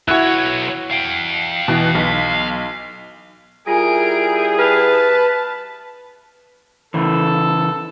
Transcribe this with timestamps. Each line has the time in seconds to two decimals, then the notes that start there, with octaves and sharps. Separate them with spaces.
0.08 B1 E4 F#4 C#5 F#6
0.91 F5 G5
1.68 B2 E3
1.95 B1 B6
3.67 G3 E4 F4 G#4 A#4 G#5 D7
4.59 B4 A5 F6 F7
6.94 C#3 E3 A4